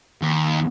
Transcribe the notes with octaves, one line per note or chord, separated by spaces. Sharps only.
D#2